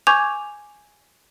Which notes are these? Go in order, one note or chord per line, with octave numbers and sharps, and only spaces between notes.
G#5 C#6 D6 G6 G#6 F7